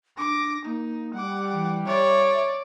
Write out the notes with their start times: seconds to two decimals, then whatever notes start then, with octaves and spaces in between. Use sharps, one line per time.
0.18 D4 D6 A#6
0.65 A#3 D#4
1.14 G3 F#5 D6
1.53 E3
1.87 C#5 D5 E5